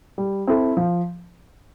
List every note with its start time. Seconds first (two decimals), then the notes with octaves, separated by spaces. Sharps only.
0.18 G3
0.47 C4 E4 A4
0.77 F3